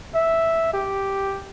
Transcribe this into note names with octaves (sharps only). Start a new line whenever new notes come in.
E5
G4